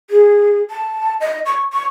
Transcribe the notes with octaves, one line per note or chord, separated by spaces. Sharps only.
G#4
A5
D#5
C#6
C#6